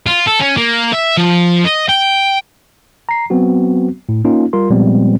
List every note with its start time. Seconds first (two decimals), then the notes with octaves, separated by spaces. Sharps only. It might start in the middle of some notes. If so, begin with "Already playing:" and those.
0.06 F4
0.27 A4
0.40 C#4
0.57 A#3
0.93 E5
1.17 F3
1.64 D#5
1.89 G5
3.09 A#5 C7
3.30 F#3 B3 C4 F#4
4.09 A2
4.25 A#3 C#4 D#4 F4
4.53 G3 F4 A#4 C6
4.70 A#2 F3 G3 G#3 B3 C4